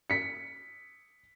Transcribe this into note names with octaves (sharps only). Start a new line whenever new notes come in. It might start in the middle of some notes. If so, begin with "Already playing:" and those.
B6 C#7